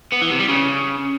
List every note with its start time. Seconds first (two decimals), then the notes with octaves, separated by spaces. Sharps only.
0.13 B3
0.22 E3
0.31 C3
0.40 G3
0.49 C#3